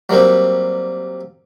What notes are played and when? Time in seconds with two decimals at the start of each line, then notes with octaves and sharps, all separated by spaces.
0.09 F#3 G3 A#3 C4